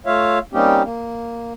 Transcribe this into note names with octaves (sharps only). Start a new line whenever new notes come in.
A3 F4 C#5 E5 F5
G3 A#3 C4 C#4 D#4 G4
A#3